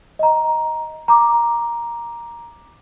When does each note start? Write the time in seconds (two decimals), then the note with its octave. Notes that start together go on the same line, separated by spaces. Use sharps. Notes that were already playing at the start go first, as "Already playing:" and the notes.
0.19 D#5 A#5
1.08 A#5 D6